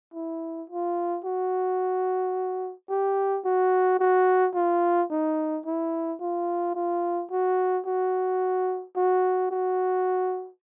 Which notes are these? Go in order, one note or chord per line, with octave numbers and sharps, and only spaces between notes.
E4
F4
F#4
G4
F#4
F#4
F4
D#4
E4
F4
F4
F#4
F#4
F#4
F#4